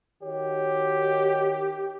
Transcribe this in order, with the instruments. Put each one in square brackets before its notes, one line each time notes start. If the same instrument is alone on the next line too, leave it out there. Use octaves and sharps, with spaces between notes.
[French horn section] D#3 F#4 C#5 [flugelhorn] G4